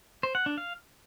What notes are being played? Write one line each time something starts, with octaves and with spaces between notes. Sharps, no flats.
C5
F#5
D4
F5